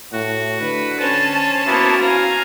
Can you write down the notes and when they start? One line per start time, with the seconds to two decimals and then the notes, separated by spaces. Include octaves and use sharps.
0.13 A2 F#4
0.61 D3 B4
1.01 C#4 C5 A5
1.66 A#3 B3 E4 F#4
2.01 F5 G#5 A#5